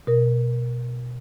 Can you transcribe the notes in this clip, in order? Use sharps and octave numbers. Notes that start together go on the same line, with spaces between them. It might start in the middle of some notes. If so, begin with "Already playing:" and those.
B2 A#4